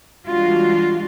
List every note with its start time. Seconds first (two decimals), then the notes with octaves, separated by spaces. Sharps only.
0.26 E3 G3 G#3 D4 F4 F#4